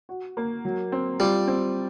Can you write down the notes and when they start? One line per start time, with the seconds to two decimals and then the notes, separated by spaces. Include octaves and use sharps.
0.09 F#4
0.37 A#3
0.65 F#3
0.92 C4
1.20 G3 F4
1.48 C4